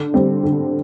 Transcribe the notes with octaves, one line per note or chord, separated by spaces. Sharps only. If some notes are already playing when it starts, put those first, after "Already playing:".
Already playing: D3
G3 C4
D3